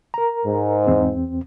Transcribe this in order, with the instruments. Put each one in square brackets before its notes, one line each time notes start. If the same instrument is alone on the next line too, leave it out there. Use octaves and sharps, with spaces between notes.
[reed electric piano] A#4 A#5
[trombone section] G#2
[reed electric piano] E2 C4